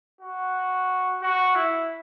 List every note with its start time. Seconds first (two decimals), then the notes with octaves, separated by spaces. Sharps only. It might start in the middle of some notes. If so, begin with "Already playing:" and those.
0.21 F#4
1.22 F#4
1.55 E4